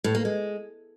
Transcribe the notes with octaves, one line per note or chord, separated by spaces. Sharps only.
A2
A#3
G#3